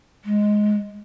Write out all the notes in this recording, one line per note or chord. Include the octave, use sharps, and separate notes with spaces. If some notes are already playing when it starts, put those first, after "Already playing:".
G#3